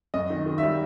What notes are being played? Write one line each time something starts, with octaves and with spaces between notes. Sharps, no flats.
F#2 D#5
D#3
D#3
E5
G3